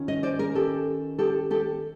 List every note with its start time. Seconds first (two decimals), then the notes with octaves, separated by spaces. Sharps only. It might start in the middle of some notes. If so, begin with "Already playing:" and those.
Already playing: D#3 C#4 F4
0.08 C#5 D#5
0.23 C5 D5
0.39 G#4 A#4
0.55 G4 A4
1.19 G4 A4
1.51 G4 A4